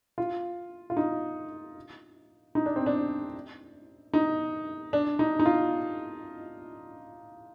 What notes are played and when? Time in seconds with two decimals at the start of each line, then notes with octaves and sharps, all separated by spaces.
0.18 F4
0.90 F4
0.97 D#4
2.55 D#4
2.66 D4
2.76 C4
2.86 D4
4.14 D#4
4.93 D4
5.19 D#4
5.40 D#4
5.46 F4